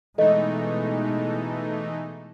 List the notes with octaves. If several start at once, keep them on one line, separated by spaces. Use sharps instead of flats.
B2 E3 G#3 A3 D#4 A4 D#5